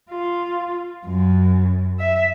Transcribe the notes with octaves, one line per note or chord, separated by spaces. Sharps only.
F4
F#2
E5